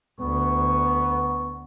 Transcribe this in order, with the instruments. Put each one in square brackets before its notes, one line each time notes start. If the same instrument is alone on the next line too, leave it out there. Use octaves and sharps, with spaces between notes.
[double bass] D2 [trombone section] B3 [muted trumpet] C#6